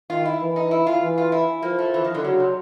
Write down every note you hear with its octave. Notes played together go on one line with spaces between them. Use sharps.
D#3 F4
E4
E3
D#4
E4
F4
E3
F4
E4
F3 A#3
A3
E3
D#3
D3
C#3 F#3
C3